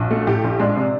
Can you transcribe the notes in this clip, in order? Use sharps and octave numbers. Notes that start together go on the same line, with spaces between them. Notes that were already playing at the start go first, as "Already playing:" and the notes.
Already playing: A#1 F#4
A3
A2 G4
A#1
G#3 D4
C3